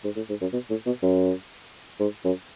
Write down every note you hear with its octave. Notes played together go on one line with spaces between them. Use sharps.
G#2
A2
G#2
F#2
B2
A2
B2
F#2
G#2
F#2